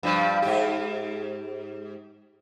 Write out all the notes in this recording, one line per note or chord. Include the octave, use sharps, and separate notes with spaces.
G2 F3 G3
G#2 G4